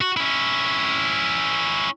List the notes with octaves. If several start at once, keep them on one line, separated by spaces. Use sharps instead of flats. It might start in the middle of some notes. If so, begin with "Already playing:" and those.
F#4
C#4 E4